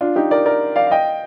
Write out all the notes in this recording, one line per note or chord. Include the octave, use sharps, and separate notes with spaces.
D4 F4
D#4 G4
A#4 D5
A#4 D5
D5 F5
F5
D#5 G5